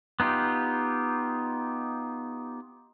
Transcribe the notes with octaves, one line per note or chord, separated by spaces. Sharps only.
B3 D#4 F4 G4